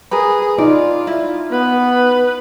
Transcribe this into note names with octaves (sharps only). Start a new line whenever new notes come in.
G#4 A#4 B4
D#4 F4 D5
E4
B3 B4